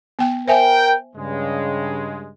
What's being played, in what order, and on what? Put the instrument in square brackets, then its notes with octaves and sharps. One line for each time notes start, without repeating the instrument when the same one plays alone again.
[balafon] B3 G5
[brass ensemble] A#4 G5 [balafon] C5 E5 G#5
[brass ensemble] G2 C#3 G#3